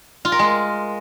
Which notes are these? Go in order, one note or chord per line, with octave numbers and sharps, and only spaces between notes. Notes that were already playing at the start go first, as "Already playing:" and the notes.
F4
A#4
G#3